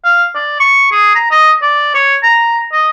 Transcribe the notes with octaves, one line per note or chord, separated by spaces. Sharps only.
F5
D5
C#6
G#4
A#5
D#5
D5
C#5
A#5
D#5